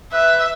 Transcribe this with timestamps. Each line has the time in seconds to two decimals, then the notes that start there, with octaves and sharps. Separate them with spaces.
0.13 B4 E5